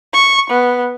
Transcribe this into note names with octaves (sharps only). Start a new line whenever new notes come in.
C#6
B3